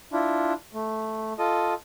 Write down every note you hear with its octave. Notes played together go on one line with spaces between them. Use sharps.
D4 E4 F4
A3
F4 A4 D#5